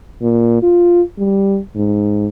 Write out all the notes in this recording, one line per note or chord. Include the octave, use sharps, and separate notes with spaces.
A#2
F4
G3
G#2